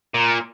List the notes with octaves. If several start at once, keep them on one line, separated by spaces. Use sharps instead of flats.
A#2